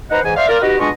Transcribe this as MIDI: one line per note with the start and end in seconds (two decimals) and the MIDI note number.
0.11 0.20 63
0.11 0.20 71
0.11 0.20 72
0.11 0.20 75
0.11 0.20 78
0.11 0.20 82
0.23 0.37 44
0.23 0.37 52
0.23 0.37 80
0.37 0.48 72
0.37 0.48 74
0.37 0.48 76
0.37 0.48 77
0.49 0.58 65
0.49 0.58 70
0.49 0.58 74
0.61 0.78 63
0.61 0.78 66
0.61 0.78 67
0.61 0.78 71
0.61 0.78 75
0.79 0.89 47
0.79 0.89 56
0.79 0.89 62
0.79 0.89 65
0.79 0.89 75
0.79 0.89 85